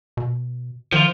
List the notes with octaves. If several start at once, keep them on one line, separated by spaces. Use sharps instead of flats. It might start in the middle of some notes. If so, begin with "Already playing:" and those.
B2
D#3 F3 F4